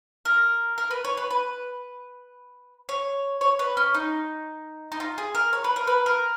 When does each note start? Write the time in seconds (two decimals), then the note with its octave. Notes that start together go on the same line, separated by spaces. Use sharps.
0.25 A#4
0.78 A#4
0.91 B4
1.04 C#5
1.17 B4
1.31 B4
2.89 C#5
3.41 C#5
3.59 B4
3.77 C#4
3.94 D#4
4.92 D#4
5.00 F4
5.18 G#4
5.35 A#4
5.53 C#5
5.64 B4
5.76 A#4
5.87 B4
6.06 A#4